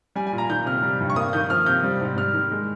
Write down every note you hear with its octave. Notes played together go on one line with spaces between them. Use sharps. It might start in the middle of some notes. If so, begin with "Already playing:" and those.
G3 G#5
G#5
A#2
A#5
D#3 G6
C3 F6
G3
G2
C#6
A#3 D#6
D#3 G6
F3 F6
C3 G6
G3
G#2
G3 F6
D#3
G#3